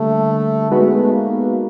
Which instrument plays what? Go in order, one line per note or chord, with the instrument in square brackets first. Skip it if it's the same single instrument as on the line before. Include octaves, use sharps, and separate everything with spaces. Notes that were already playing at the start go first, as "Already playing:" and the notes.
Already playing: [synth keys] D3 G3 A#3 D4 [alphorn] A3
[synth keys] G#3 B3 D#4 F#4 B4 [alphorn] A3
[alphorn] A#3